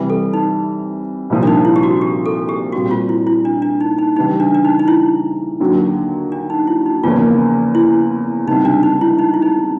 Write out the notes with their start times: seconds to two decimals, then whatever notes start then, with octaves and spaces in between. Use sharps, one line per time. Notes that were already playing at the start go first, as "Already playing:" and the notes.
Already playing: C3 E3 G3
0.10 A4
0.33 D#4
1.30 C2 A#2 F3
1.43 D4
1.47 D#4
1.65 E4
1.76 G4
1.83 F#4
2.01 G4
2.26 A4
2.49 G4
2.72 A#2 G3 C4 F#4
2.91 F4
3.09 E4
3.27 E4
3.45 D4
3.62 D4
3.81 D#4
3.99 D#4
4.16 C#3 E3 G3 D#4
4.40 D4
4.55 D4
4.65 D#4
4.79 D#4
4.88 E4
5.60 D#2 D3 F#3
6.32 D4
6.50 D#4
6.67 E4
6.86 D#4
7.03 E2 C#3 F3 A#3 C#4 F4
7.75 E4
8.46 C#2 C3 D#3 G3 D#4
8.65 D4
8.83 D#4
9.01 E4
9.19 D#4
9.34 E4
9.42 D#4